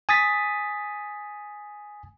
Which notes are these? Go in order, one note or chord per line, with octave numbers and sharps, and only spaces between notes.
G#5 D#6 A6 B6